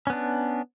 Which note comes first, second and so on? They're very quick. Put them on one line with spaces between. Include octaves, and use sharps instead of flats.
C#4 B3 D4